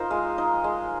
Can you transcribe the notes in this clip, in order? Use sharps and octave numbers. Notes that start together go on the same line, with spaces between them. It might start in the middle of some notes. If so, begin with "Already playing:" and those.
Already playing: D#4 F4 A#4 C5
G#3 F5
D#4
G#3